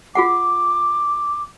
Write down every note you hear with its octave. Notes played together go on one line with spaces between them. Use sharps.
F4 G#4 F#5 D6